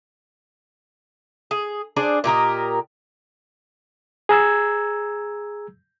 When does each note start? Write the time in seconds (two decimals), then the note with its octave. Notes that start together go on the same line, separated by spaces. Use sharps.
1.51 G#4
1.96 D4 G#4 C5 D5
2.24 A#2 G4 A#4 D#5
4.29 G#4 A#5 E6 G#6